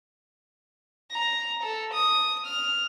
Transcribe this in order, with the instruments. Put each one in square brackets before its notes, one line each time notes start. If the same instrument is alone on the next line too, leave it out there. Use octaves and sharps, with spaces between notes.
[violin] A#5
A4
D#6
F6